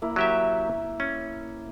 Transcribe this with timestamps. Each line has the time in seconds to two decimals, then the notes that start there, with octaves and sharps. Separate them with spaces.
0.02 A#3 E4
0.16 F#3 G4 E5
1.00 C#4